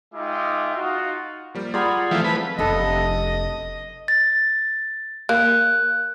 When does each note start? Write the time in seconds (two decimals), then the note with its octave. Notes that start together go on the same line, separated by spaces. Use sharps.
0.14 G#3 D#4 F4 E5 G5 D6
0.75 D#4 F4 F#4
1.55 F3 G3 A#3
1.74 G3 F4 G#4 D5 F#5 A#5 B5
2.11 E3 F3 A3 C4 A4
2.24 B4 A5
2.59 F1 B3 D4 A4 D#5
4.08 A6
5.29 A#3 F#6